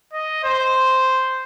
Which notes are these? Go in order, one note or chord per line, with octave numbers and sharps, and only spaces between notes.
D#5
C5